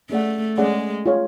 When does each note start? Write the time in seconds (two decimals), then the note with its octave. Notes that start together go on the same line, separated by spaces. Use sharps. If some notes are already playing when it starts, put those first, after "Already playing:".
0.10 A3 C#4 G#4 D5 F#5
0.58 G#3 C#4 G#4 D5 F#5
1.06 F4 G#4 C#5 F5